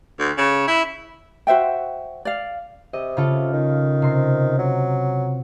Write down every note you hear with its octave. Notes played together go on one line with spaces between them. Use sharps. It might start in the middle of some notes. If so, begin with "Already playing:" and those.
D2
C#3
E4
F#4 C5 E5 G5
D5 F5
C3 D#5
C#3 F4 A4
D#3
C3 C6
F#3